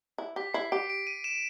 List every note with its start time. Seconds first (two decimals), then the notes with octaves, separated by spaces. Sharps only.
0.18 E4
0.36 G4 B6
0.54 E4 C7
0.72 G4 D7
0.90 D7
1.07 D#7
1.24 E7